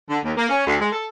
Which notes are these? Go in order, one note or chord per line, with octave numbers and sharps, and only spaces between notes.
D3
D#2
A#3
C#4
D2
G#3
A4